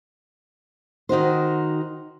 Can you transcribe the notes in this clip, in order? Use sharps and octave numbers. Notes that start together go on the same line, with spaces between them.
D#3 D#4 F#4 C5